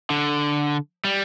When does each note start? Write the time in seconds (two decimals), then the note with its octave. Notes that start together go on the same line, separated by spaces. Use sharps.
0.10 D3
1.05 G3